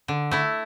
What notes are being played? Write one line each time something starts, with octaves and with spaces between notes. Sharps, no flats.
D3
A3 E4